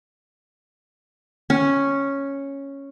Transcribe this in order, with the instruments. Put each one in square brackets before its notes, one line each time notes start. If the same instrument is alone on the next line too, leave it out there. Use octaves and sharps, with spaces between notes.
[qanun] C#4